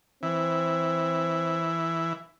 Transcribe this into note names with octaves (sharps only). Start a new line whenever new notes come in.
E3 C4